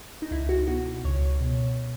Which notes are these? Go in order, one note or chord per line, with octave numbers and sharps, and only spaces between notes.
D#4
C#2 E4
F#4
B2 F#4
C#2 C#5
B2